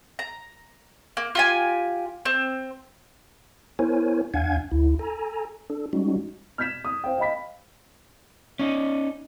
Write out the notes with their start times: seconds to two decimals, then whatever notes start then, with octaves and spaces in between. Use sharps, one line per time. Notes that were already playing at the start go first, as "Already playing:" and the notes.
0.19 A#5
1.17 A#3
1.35 F4 G4 G#5
2.25 C4
3.79 B3 E4 A#4 C5 C#5 G#5
4.34 E2 D4 F5 F#5 G#5 G#6
4.71 D2 E4
4.99 A4 G#5 A#5
5.70 D4 A4
5.93 G3 G#3 C#4 D#4 F#4
6.58 F6 G6 G#6 B6 E7
6.85 D#6
7.04 C5 F5 G5
7.18 D#5 F5 B5 B6
8.59 C#4 D#4